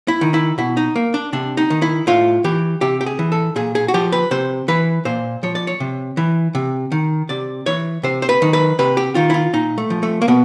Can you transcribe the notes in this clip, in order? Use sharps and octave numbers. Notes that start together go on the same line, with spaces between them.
E4
D#3
E4
B2 E4
D#4
A#3
D4
C3 D4
D#4
D#3
E4
A2 F4
E3 G4
C3 G4
G4
G#4
E3
A4
A#2 G#4
G#4
F#4
F3 G4
B4
C3 C5
E3 B4
A#2 C5
F3 C#5
D5
C#5
C3
E3
C3
D#3
C3 D5
E3 C#5
C3 C5
C5
B4
D#3
B4
C3 B4
G4
D#3 F4
E4
F4
A#2 D#4
A3
F3
A3
A#3
B2 B3